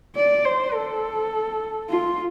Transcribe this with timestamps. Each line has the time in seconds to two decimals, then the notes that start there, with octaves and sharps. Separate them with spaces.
0.16 D5
0.45 C5
0.74 A4
1.90 F4